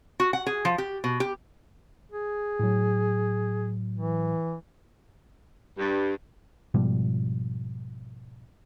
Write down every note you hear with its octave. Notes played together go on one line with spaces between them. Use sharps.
F#4
F#5
G#4
F3
G4
B2
G4
G#4
A2 F#3
E3
G2
G#2 B2 F3 G3